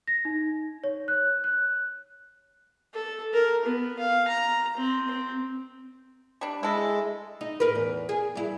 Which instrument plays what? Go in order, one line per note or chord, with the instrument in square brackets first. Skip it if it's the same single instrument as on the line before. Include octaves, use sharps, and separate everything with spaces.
[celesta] A#6
D#4
C#5
F#6
F#6
[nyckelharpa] A4
A#4
B3
F5
A#5
C4
C4
[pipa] G3 D4
[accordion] G#3 [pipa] E4 A4
[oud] D#4
A2 A#4 B4
E2
G#4
G2 E4